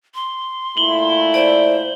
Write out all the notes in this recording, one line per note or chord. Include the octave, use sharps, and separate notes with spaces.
C6
A#2 A3 E4 F#7 G7
C5 D5